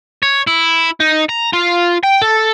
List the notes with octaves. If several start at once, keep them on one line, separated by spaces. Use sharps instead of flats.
C#5
E4
D#4
A#5
F4
G5
A4